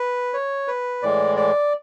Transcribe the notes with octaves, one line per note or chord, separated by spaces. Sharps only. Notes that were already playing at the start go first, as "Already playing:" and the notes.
Already playing: B4
C#5
B4
A2 E3 G#3 D5
D5